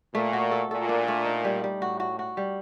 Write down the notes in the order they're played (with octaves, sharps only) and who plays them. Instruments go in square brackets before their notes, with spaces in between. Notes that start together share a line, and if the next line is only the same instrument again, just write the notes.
[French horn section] A#2 [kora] A3
[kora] F#4
A4
[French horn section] A#2 [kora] A4
[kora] D4
A3
D#4
G3
G3
[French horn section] A2 [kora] F#4
[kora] F#4
F#4
G3